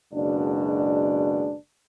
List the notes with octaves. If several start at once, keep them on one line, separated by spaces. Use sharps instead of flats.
F#1 B2 G#3 D4